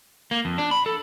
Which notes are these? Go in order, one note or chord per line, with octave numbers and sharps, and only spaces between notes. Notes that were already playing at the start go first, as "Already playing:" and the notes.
A#3
F2
D4
B5
A4